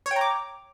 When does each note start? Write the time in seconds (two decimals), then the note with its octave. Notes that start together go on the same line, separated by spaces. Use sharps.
0.06 C#5
0.11 G5
0.16 A#5
0.21 D6